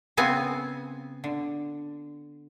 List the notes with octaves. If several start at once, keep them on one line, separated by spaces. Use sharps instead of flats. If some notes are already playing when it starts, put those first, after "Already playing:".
C#3 B3 C4 G#5
D3